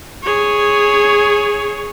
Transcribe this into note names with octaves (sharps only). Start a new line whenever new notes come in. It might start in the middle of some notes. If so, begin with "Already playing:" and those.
G#4 C#5